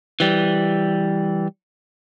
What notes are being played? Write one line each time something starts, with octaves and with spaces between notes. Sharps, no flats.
E3 G3